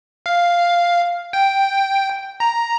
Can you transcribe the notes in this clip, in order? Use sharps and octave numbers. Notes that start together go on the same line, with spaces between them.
F5
G5
A#5